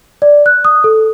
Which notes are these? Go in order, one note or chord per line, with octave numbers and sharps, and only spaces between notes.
D5
F#6
D#6
A4